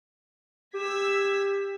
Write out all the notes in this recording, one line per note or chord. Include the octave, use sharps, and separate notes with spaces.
G4 E6 G#6 B6